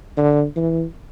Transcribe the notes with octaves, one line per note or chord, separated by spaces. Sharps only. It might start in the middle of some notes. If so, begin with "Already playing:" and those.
D3
E3